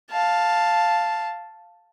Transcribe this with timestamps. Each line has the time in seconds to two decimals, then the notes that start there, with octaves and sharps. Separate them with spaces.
0.11 F5 A5